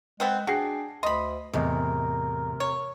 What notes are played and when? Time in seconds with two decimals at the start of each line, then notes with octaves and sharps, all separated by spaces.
0.20 G#3 B3 C4 F#5
0.47 D4 F#4 G#4 G5 C7
1.03 D2 D#5 B5 C6
1.54 E2 A2 C3 G#3 A#4
2.60 C#5